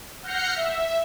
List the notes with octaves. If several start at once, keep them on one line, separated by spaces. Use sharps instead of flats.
F#5 F6 G6 A#6 C7 C#7
E5